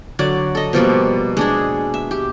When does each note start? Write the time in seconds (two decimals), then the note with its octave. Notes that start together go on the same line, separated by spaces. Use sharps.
0.19 D3 F#3 D5
0.55 A4 D#5
0.73 B2 F3 G3 A#3
1.37 G#3 D4 G#4
1.94 E5
2.11 G4